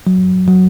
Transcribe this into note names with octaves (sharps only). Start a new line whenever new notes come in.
F#3
F#3